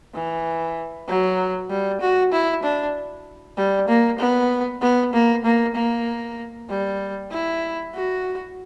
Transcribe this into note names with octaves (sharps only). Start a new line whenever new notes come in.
E3
F#3
G3
F#4
E4
D4
G3
A#3
B3
B3
A#3
A#3
A#3
G3
E4
F#4